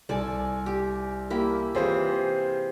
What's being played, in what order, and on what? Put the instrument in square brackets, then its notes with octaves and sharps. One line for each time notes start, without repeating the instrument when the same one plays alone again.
[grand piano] C2 G#5 [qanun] A4 D5 A5
[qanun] G4
A#3 E4 G4
[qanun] C3 E3 [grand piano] F4 G#4 C5